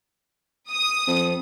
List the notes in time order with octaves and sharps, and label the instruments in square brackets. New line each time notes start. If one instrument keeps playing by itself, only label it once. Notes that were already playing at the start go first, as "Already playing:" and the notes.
[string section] D#6
[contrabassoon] F2